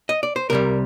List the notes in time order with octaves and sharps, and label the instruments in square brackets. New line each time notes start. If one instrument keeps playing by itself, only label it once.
[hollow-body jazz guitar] D#5
D5
C5
C2 C3 G3 A#4